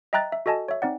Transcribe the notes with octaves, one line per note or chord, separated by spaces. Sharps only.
D#5 E5 G5 A#5 F#6 A6
E5
F#4 A4 D#5 G#5 A5
C#5 E5
C4 D#4 D5 F#5